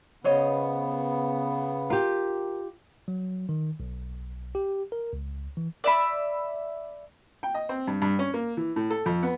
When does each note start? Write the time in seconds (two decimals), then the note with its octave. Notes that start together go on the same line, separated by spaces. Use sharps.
0.24 C#3 B3 C5 C#5 D#5
1.90 F4 G4 A#4
3.08 F#3
3.49 D#3
3.80 B1
4.55 G4
4.92 A#4
5.13 C#2
5.57 E3
5.84 D5 E5 B5
7.43 G5
7.55 D#5
7.69 C4
7.87 G2
8.02 G2
8.19 C#4
8.34 A#3
8.57 E3
8.76 A2
8.90 A4
9.06 F2
9.23 B3